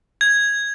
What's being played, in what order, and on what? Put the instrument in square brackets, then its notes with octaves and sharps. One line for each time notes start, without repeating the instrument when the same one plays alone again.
[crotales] G#6